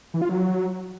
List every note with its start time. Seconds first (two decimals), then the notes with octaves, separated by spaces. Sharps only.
0.14 E3
0.22 F4
0.29 F#3